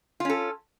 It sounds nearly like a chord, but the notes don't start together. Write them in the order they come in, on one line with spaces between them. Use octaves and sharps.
F4 C#4 A4